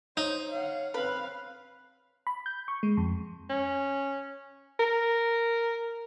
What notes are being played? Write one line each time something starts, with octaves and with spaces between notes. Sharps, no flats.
D#4 C5 C#5
C#5 F5 F#5
C4 B4 F5
B5
G6
C#6
G#3
F2
C#4
A#4